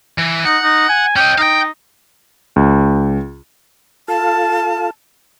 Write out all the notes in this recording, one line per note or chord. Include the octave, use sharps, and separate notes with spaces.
E3
D#4 F#5
D#4
G#5
C#4 D#5 G5
D#4 F5 G5
C#2
F4 A4 F5 A5